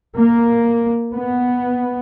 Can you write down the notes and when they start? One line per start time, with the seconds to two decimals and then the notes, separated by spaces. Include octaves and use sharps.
0.18 A#3
1.15 B3